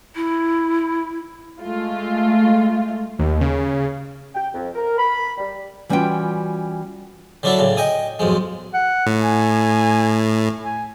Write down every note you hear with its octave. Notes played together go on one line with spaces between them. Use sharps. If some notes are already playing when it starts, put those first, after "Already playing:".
E4
G#3 A3 F4
D#2
C#3
G5
F2
A#4
B5
G3
E3 G3 C#4 F4 F#4 G5
D3 F#3 D4 E4 A4
A2 C#3
D#5 G5 G#5 D#6
B1 F2 G#2 G#3
F#5
A2
G#5
G#5